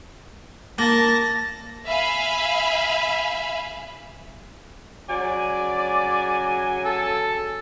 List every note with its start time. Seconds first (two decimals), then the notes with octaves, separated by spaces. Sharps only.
0.78 A#3 A5 A#6
1.86 E5 F5 G#5 B5
5.10 C#3 F#3 D5 G#5
6.85 A4